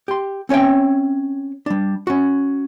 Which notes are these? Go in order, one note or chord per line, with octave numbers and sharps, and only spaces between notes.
G4 C6
C4 C#4 C#5 E5 G5
G3 D4
C#4 F#4